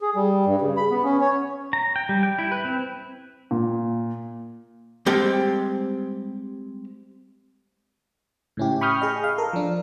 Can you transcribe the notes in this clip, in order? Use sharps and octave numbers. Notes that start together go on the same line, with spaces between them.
G#4
G3
G2
C#3
B5
B3
C#4
C#5
A#5
G5
G3
G5
E4
B4
C4
A#2
G3 G#3 C4 G4 A4
A2 C#3 C#4 E4 G4
G5 B5 C#6 D#6 F6 G6
G#4 D#5
F5
A4 A#4
F3 D4